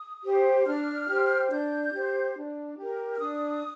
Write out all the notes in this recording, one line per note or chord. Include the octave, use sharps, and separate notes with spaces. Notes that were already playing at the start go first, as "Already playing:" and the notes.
Already playing: D#6
G4 C5
D4 F6
G4 C5
D4 G6
G4 C5
D4
G4
A#4
F6
D4 D#6